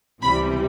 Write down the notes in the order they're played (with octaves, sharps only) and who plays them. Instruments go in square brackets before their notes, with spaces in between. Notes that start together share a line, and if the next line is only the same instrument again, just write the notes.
[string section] C#2 C3 E3 G3 B5